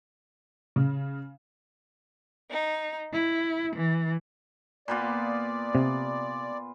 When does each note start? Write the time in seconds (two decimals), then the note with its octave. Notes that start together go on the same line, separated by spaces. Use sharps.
0.76 C#3
2.50 D#4
3.13 E4
3.76 E3
4.88 A#2 B3 F4 D5
5.75 C3